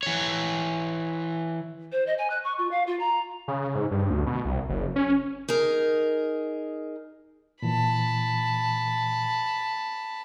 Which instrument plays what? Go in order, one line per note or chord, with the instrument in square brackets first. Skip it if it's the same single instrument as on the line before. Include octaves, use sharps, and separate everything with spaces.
[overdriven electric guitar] E3 C#5
[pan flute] C5
D#5
G#5
F#6
C#6
F4
F5
F4
A#5
[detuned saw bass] C#3
G#2
G2
D2
B2
C2
F#1
C#4
[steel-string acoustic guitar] D#4 G#4 A#4
[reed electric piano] A#2 E3 [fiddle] A5 B5